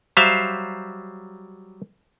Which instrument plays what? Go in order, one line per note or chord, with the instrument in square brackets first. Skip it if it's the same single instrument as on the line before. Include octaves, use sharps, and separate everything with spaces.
[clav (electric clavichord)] F#3 G3 C5 E5 F5